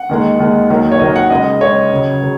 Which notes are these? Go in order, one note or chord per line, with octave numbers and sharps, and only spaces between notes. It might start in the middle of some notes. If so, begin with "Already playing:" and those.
Already playing: F#5
D#2 D#3 G#3
D#2 D#3 G#3
D#2 D#3 F#3
C#5
D#2 D#3 F#3 D#5
F#5
C#2 C#3 G#3 D#5
C#2 C#3 G#3 C#5
C#2 C#3 F#3
C#3 F#3